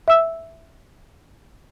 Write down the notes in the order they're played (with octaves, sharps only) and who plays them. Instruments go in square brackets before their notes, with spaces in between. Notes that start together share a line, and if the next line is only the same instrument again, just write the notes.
[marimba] E5 E6